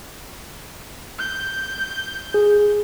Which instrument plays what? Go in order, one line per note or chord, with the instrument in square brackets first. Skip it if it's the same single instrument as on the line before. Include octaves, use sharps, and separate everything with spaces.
[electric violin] G6
[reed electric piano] G#4